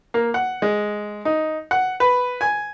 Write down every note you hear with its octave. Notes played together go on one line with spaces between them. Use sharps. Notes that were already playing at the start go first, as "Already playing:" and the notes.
A#3
F#5
G#3
D#4
F#5
B4
G#5